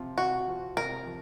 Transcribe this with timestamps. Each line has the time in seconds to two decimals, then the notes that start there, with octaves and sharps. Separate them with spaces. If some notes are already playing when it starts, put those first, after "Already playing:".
Already playing: C3 F3 C4 F4
0.18 C3 F#4
0.47 F3 C4 F4
0.77 C3 A#4
1.06 F3